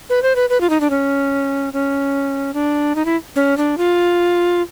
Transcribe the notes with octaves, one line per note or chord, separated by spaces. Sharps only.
B4
C5
B4
B4
F4
D#4
D4
C#4
C#4
D4
D#4
E4
C#4
D4
F4